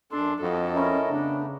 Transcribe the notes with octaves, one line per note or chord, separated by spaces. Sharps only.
F#2 D4 A4 C6
F2 F#4 A4 D#5
C#4 E4 A#4 D#5
C#3 A3 B3 D4